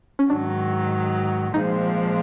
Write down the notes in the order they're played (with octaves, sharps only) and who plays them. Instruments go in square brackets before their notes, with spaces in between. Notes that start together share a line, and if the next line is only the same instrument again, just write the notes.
[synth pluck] C#4
[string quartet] G#2 D#3 F#3 [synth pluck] D4
[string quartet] A#2 F3 G#3 C4 [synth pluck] D#4